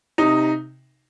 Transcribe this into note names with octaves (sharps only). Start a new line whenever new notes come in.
C3 D#4